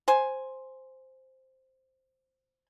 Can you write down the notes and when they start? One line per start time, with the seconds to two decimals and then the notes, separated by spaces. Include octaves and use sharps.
0.08 C5 G#5